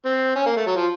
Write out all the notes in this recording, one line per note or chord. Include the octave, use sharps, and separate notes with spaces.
C4
C#4
A#3
A3
F#3
F3